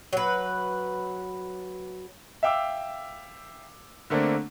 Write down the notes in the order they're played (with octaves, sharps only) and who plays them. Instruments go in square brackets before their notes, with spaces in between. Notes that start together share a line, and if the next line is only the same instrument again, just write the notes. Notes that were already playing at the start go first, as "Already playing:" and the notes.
[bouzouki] F#3 B4
[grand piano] E5 F5 G5 D6 E6
D3 A3 A#3 C4 D4